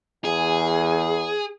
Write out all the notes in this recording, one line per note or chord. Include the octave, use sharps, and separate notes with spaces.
E2 G#4